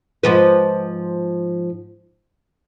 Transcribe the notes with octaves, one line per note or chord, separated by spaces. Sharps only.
G#2 F3 B4